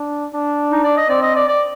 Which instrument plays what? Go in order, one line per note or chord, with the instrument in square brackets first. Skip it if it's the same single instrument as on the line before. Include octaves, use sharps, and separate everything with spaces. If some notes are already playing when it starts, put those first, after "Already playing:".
Already playing: [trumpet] D4
D4
[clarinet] D#4
D5
D#5
[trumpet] C4 [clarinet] D5
[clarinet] D#5
D5
D5